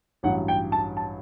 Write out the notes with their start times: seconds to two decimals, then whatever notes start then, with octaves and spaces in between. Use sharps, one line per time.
0.23 A1 G2 F#3 F#5
0.48 G5
0.72 A5
0.97 A5